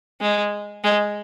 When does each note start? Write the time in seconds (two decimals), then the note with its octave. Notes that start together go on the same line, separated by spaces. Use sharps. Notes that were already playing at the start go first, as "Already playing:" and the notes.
0.21 G#3
0.84 G#3